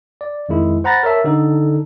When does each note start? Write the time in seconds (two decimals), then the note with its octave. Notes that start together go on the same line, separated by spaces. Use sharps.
0.21 D5
0.49 F2 D#3 G#3 E4
0.84 C5 F#5 A#5 B5 A6 A#6
1.03 A#4 C#5 E5 A5
1.24 D3 D#4 A4